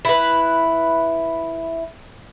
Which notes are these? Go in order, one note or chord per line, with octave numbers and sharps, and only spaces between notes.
E4 B4